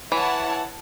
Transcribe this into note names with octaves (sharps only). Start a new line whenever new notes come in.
E3 E4 C#5 F#5 A5